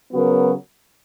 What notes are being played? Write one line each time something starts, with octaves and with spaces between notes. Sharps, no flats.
C#3 F#3 B3 F#4 A#4